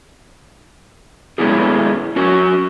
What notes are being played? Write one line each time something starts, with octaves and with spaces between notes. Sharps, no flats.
G#3 A3 B3 C#4 E4 G#4
C#4 F#4 A#4